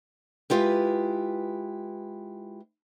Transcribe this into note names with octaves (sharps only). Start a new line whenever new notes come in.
G#3 E4 F4 G4 B4